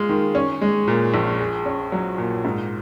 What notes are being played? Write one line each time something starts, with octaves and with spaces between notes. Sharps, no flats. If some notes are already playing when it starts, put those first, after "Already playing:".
Already playing: G#3 F4
D#3
C#4
G#3
A#2
A#1
G#4
C#4
F#3
A#2
G#2